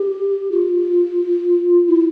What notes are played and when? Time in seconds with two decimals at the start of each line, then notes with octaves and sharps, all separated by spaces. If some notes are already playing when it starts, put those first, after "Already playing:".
Already playing: G4
0.51 F4
1.89 E4